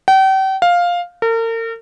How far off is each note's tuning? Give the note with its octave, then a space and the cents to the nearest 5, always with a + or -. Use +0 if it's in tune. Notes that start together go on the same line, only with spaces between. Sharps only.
G5 -40
F5 +5
A#4 -40